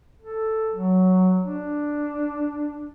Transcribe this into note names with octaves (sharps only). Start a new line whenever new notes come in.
A4
F#3
D4